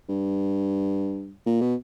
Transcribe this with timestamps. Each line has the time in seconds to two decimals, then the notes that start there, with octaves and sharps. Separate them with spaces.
0.09 G2
1.47 A#2
1.61 B2